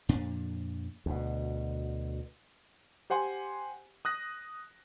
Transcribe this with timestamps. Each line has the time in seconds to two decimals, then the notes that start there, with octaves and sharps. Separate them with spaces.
0.09 F2 A#2 D4
1.06 D2 B2
3.10 G4 C5 F#5 G#5 C6
4.05 D#6 F#6 A#6